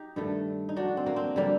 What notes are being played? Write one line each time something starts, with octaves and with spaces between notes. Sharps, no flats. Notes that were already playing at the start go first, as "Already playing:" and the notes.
Already playing: D#4 G4
G2 D#3 A3
D#4
D4 F#4
C4
A#3
C4
D3 G3 A#3